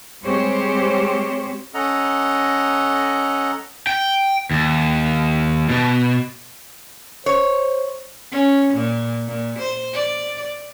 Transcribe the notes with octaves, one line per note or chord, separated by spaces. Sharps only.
G3 G#3 C4 G4 C5 C#5
C#4 A4 D#5 F#5 A#5
G5
D#2
B2
C5 C#5
C#4
A#2
A#2
C5
D5